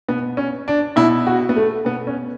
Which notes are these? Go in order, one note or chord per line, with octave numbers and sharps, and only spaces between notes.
B2 B3
C#4
D4
B2 E4
F#4
B3
A3
B2 B3
C#4